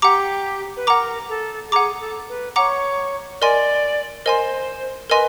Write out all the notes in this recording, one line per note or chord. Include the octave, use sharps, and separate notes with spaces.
G4 F#5 A#5 D6
B4
A#4 F#5 A#5 D6
A4
G#4 F#5 A#5 D6
A4
B4
C#5 F#5 A#5 D6
A#4 D5 D#5 G#5 C6
A#4 C5 D#5 G#5 C6
A#4 B4 D#5 G#5 C6